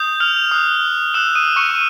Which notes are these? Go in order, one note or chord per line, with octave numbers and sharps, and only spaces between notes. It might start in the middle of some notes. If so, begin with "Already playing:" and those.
Already playing: D#6 G6
F6 F7
D#6 F#6
D#6 E6 F#6 E7
D#6 D#7
C#6 C#7